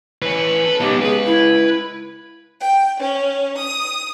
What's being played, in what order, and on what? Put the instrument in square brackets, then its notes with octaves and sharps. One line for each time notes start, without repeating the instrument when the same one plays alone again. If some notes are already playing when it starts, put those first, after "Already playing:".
[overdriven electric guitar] E3 C#4 [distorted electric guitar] B4
[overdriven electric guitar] A4
[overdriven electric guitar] C#2 [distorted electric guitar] B3 D#4 [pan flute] G4
[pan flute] G#4 [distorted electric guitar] B4
[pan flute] E4
[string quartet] G5
C#4
D#6